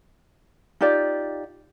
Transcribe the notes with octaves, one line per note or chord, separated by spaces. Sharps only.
D#4 F4 G4 D5